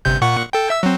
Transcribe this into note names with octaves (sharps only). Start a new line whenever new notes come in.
G1 C3 G6
A#2 F#5 C#6
A4 G5
E5 E6
F#3 C4